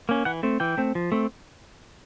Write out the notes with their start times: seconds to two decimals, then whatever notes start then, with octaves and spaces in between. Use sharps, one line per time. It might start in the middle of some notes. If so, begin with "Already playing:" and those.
0.09 A#3 C#4
0.25 E3 F#5
0.43 A3 C4
0.60 E3 G5
0.77 A3 C4
0.95 F3
1.12 A3 C4